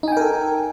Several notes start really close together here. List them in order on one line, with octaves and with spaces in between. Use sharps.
D#4 G#5 G5 A#4 A4